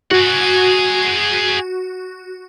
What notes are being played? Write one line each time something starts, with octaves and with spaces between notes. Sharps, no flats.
F#4 G#4 F#5